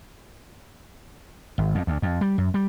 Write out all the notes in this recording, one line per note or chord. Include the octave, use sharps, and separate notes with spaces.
G#1
F2
D2
F2
G3
F#2
G3